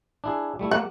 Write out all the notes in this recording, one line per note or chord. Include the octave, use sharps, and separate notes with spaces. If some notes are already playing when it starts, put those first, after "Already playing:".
D4 E4 G#4
G3 A3 E4
A3 A#3 F#5